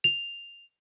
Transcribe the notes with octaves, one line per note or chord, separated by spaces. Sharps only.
F7